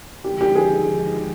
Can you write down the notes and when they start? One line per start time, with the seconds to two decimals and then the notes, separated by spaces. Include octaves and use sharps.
0.24 D#2 D3 F3 G#3 D#4 G4
0.41 G4
0.56 G#4